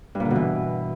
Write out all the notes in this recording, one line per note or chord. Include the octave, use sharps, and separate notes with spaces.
G2
A#2
D3
B2
E3